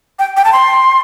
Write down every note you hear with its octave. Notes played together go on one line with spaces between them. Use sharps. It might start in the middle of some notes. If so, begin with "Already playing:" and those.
G5
G5
A5
C6